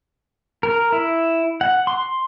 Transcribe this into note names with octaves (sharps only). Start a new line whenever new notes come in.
A#4
E4
F#5
C6